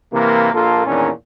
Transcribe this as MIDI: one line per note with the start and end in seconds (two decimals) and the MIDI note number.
0.13 0.53 48
0.13 0.53 52
0.13 0.53 58
0.54 0.84 34
0.54 0.84 58
0.54 0.84 65
0.54 0.84 69
0.86 1.10 40
0.86 1.10 46
0.86 1.10 51
0.86 1.10 61
0.86 1.10 62